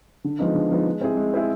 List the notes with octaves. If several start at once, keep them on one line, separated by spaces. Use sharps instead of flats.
D3
F3 G#3 B3 D#4
D3
F3 G#3 B3 D#4
G#3
C4 E4 G#4
G#3
C4 E4 G#4